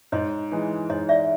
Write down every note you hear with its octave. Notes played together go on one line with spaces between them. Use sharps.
G#2 C#5 D#5
E3 G#3
G#2 C#5 D#5
D5 E5